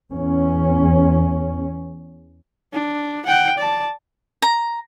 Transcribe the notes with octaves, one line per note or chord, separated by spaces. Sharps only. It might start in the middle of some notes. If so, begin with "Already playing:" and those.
E2 C#4
D4
F#5 G5
D5 A5
A#5